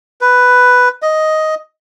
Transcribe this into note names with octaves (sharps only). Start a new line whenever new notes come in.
B4
D#5